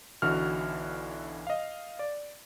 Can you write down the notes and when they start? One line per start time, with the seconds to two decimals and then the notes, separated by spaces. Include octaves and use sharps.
0.22 B1 D3 E3 F#4 F6
1.47 D#5 F5
1.99 D5